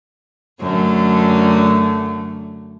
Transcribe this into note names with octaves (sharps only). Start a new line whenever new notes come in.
F#2 D3 A3